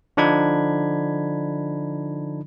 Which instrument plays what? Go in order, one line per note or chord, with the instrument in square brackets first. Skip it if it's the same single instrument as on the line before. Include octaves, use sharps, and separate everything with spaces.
[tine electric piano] D3 F3 D4 D#4 B5 G#6